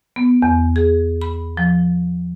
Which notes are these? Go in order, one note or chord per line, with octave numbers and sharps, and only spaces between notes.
B3
E2
G#4
B5
F3